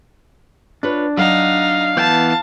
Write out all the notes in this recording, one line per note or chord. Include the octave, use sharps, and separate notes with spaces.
D4 F4 B4 C#5
F#3 D#4 F5
E3 B3 A5 G6